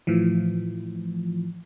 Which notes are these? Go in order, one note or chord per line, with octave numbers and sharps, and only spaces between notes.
A2 E3 F3